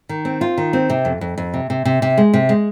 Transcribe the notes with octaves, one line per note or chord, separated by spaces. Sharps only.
D#3
C4
F4
D#3
C4
C3
F2
F2
F2
C3
C3
C3
C3
G#3
C3
G#3